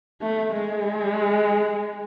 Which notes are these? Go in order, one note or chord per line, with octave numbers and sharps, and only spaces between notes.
A3
G#3